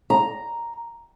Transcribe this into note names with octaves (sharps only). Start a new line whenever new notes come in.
A#5